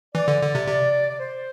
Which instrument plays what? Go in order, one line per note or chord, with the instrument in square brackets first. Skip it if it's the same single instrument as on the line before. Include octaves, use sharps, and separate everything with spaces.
[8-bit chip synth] E3 [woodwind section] D5
[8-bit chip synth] D3
D3
C3
C3
[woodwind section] D5
C5